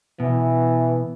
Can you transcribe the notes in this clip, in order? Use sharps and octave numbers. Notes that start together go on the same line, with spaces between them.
B2 E3